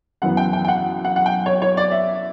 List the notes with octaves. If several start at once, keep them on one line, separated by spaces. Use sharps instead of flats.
F#2 E3 B3 F#5
G5
G5
G5
F#5
F#5
F#5
G5
C#5
C#5
D5
E5